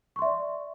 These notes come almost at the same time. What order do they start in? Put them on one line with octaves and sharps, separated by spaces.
C#6 C6 E5 D5